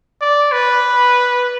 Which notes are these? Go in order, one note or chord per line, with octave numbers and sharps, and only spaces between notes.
D5
B4